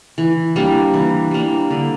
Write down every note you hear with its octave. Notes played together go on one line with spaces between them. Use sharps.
E3
G3 A#3 D4
E3
G3 A#3 D4
D3